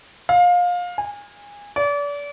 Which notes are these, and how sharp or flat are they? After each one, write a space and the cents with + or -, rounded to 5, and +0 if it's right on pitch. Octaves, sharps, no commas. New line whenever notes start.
F5 +25
G#5 -25
D5 -35